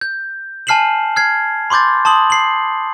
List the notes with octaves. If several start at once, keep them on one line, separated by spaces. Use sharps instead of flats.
G6
G#5 A5 F6 C7 E7 F#7
F6 G#6 C7
B5 C6 D6 G6 A6
A5 C6 D#6 F#7
C7 F#7